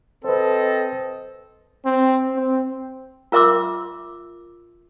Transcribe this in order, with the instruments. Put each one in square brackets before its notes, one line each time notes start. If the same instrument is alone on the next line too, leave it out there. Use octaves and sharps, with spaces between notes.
[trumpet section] C4 A4 D#5 [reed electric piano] B4 C5
[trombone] C4
C4
[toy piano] F4 A#4 E5 C6 D6 E6